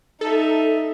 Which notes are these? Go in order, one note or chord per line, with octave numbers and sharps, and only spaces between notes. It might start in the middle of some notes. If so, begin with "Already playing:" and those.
D#4 A4 E5